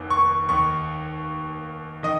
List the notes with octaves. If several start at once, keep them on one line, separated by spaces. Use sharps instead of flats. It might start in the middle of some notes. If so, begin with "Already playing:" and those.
Already playing: F1 D#2 D#3
C#6
D#2 D#3 C#6
D#3 D#5